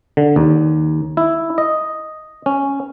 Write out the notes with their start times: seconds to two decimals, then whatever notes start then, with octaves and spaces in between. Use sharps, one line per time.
0.17 D3
0.36 D#2
1.17 E4
1.58 D#5
2.46 C#4